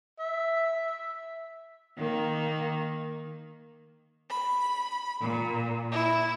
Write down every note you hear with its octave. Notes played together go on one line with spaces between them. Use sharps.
E5
D#3 A#3
B5
A#2
E4